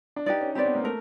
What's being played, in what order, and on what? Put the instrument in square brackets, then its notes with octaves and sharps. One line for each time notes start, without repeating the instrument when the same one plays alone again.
[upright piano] D4
[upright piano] D#4 [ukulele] G4 B4 D5
[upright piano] C#4
[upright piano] C4 [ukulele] G4 B4 D5
[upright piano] B3
A#3
[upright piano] A3 [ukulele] A#4